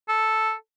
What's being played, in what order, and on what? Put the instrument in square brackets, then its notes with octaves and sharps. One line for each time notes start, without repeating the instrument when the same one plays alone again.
[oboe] A4